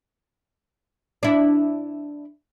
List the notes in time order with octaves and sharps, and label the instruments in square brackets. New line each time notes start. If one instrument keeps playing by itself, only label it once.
[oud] D4 E4